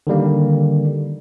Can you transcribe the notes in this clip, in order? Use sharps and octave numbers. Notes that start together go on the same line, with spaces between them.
D3 D#3 G3 A#3